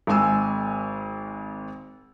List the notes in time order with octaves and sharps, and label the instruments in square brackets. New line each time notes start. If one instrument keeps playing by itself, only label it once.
[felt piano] G#1 G#3 G#5 E6